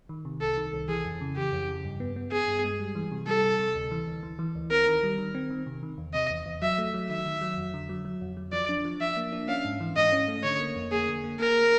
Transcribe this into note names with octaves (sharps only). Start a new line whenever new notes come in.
D#3
C3
C2 A4
D#3
C2
E3 G#4
F2
C#3
E3 G4
F2
C#3
G2
B3
B3
B3 G#4
G2
G#3
G3
E3
C3
G3 A4
C3
C3
D2
E3
D2
E3
E3
D2
C4 A#4
D#3
G3
D#3
C4
D#3
C3
D#3
E2
C3 D#5
E2
E2
F#3 E5
A3
F#3
D#3 E5
D#3
F#3
F2
D3
F#3
F#3
F2
F#3
F3 D5
D4
F3
F3 E5
A#3
D4
C#4 F5
G#2
E3
G#2 D#5
C#4
A3
D3 C#5
A#3
F2
A#3 G#4
D3
A#3
A#3 A#4